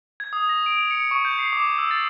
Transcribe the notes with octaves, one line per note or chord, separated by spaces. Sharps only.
G#6
D#6
A#6
D7
F7
C#7
C#6
G6
C7
D6
E6
A6